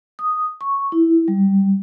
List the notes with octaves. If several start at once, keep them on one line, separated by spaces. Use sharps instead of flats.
D#6
C#6
E4
G3